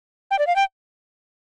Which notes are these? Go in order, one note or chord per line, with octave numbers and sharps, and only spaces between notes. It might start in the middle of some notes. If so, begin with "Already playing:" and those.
G5
D5
F5
G5